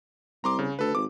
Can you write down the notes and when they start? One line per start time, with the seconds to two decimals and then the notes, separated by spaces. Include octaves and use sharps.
0.44 C2 A#5 C6 D6
0.59 C#3
0.79 D2 A4 B4
0.95 G#1 D6